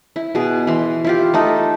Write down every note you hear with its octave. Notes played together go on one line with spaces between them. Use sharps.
E4
B2 G#4
E3 C6
E4 F4 G4
A3 D#4 A4